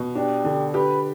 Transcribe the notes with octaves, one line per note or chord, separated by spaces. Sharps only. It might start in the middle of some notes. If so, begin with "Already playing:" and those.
Already playing: B2
D4 G4
D3
G4 B4